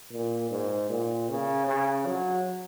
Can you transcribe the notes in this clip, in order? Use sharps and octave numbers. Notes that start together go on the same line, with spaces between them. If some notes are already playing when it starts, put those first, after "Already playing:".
A#2
G#2
A#2
C#3
C#3
F#3